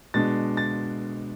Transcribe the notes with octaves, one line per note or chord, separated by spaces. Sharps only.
B2 G#3 D4 A6
A6